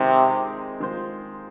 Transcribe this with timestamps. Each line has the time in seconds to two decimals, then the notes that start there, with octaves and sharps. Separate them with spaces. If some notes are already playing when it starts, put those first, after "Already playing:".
Already playing: C3 D#3 G#3 C4 D#4 G#4
0.80 D#3 G#3 F4 C5